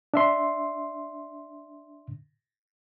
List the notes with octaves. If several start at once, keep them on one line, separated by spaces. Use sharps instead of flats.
D4 E5 C6